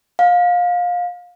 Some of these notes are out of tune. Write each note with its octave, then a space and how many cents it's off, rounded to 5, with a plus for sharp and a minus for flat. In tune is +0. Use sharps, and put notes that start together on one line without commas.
F5 +25